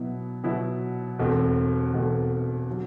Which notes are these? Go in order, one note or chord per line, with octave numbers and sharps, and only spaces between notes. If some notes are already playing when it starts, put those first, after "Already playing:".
Already playing: B2 F#3 B3 E4
B2 F#3 B3 E4
E1 E2 B2 A3 C4
E1 E2 B2 A3 C4
F#3